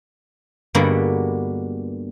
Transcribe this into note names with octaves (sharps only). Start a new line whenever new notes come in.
G2 D3 G#3 A#3 B3 F#4